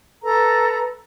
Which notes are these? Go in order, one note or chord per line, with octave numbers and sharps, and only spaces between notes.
A4 B4 A#5